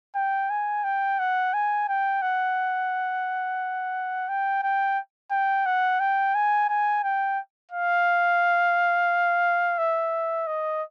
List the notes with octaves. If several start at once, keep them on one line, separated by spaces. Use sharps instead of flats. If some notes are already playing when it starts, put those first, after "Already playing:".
G5
G#5
G5
F#5
G#5
G5
F#5
G5
G5
G5
F#5
G5
G#5
G#5
G5
F5
E5
D#5